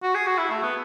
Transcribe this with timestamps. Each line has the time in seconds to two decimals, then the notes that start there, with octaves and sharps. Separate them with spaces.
0.03 F#4
0.15 G#4
0.27 F#4
0.38 E4
0.50 A3
0.63 B3